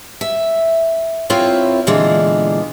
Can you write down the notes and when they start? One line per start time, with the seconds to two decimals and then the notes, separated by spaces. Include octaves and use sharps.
0.21 E5
1.30 C4 E4 F4 A#4 C#5
1.87 A#2 D3 E3 G#3 B3 F4